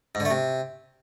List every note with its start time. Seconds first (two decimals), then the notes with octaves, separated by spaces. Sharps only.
0.15 G#2
0.20 D3
0.25 A3
0.30 C3